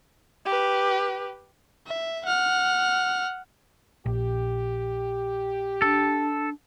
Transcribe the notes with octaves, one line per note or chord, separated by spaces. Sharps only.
G4 B4
E5
F#5 F6
A#1 G4
D4 A4